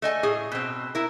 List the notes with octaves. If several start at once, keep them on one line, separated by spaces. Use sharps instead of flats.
A3 D#5 G#5
A2 G#4
B2 C4
E4 A#4